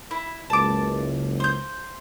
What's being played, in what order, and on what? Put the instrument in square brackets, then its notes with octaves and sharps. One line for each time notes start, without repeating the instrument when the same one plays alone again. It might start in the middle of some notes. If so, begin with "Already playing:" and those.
[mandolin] E4
[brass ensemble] F#1 C#2 [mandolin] A5 D6
[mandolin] C5 G6